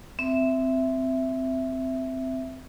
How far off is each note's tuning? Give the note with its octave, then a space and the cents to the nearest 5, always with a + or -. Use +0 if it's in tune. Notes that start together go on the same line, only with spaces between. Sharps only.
C4 -15 E5 +0